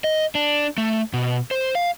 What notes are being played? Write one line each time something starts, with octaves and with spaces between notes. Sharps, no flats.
D#5
D4
A3
B2
C5
F5